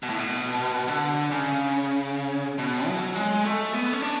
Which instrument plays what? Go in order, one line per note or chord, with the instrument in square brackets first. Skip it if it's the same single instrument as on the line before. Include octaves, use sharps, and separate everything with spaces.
[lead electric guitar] B2
A2
B2
D3
C#3
B2
F#3
G#3
A3
B3
C#4
D4